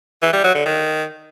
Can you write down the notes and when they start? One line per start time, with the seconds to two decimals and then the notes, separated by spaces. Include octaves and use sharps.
0.22 E3
0.33 G3
0.44 F#3
0.55 D3
0.66 D#3